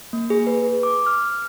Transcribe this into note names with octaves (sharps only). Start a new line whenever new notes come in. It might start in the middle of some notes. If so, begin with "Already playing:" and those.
A#3
G#4
B4
D6
F6